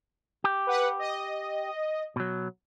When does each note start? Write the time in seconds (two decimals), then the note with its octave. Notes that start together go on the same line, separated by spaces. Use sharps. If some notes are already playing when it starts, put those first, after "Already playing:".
0.44 G4
0.67 B4 F#5
0.99 D#5
2.16 B2 F#3